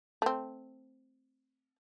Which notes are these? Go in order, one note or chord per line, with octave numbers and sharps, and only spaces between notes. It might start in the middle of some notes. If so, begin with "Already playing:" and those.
A3 C4